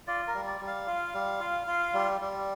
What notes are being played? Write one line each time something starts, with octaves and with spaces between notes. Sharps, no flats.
F4 D5
A#4
G3
D5
G3
F5
F4
G3
F4
F4
G3
G3